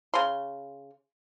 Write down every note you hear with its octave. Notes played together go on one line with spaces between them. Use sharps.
C#3 C6